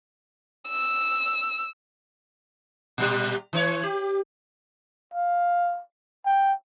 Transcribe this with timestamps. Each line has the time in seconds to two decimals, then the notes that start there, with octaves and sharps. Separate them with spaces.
0.69 E6
2.98 A#2 G3 G4
3.53 E3 C#4 C#5
3.83 G4
5.14 F5
6.25 G5